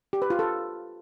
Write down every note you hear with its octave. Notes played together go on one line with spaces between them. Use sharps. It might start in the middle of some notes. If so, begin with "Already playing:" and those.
G4
B4
F4
A4